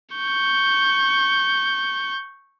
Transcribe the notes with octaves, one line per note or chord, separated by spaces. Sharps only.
C#6 G6